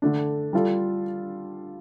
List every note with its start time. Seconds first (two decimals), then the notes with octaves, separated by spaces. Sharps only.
0.02 D3 A3 D4
0.53 G3 F4 A4